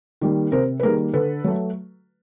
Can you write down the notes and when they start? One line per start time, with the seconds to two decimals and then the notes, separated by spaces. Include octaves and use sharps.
0.21 D#3 G3 A#3
0.52 C3 A#4 C5
0.80 B4
0.83 D#3 G3 A#3 G#4 A#4
1.14 D3 A4 B4
1.44 F#3 A3